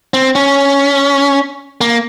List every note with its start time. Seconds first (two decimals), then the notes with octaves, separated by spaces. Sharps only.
0.14 C4
0.35 C#4
1.81 A#3